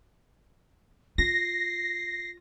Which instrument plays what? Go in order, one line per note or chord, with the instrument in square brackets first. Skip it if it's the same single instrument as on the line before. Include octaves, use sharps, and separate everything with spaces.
[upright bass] F4 [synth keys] A#6 [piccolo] C7